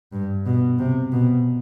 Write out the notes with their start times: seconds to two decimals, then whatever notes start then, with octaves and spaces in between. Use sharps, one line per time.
0.13 G2
0.46 B2
0.79 C3
1.12 B2